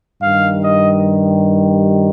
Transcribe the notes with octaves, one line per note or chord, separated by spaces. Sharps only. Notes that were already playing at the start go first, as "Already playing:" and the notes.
G2 D#3 G3 F5
D#5